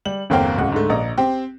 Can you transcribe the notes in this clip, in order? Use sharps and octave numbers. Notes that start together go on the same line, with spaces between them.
G3 F#7
G1 E2 A#3 C4 F5 G5
D1 C#2 F#5
G#2 D3 A3
A#1 D#5 A#5
C4 G4